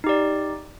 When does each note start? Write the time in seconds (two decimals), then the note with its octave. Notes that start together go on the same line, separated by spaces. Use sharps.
0.04 D#4
0.07 G4
0.09 D5